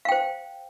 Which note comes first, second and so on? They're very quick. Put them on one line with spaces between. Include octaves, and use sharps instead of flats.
F5 G5 C5